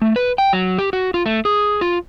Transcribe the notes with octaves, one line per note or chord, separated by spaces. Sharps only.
A3
B4
G5
F#3
G4
F#4
F4
A3
G#4
F4